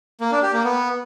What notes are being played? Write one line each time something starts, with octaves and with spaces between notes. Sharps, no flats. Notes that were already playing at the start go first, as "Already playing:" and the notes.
A#3
D4
G4
A#3
B3